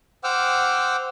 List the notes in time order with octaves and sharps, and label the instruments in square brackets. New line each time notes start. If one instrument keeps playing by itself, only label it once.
[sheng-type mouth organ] C5 F#5 G5 D6 E6 F6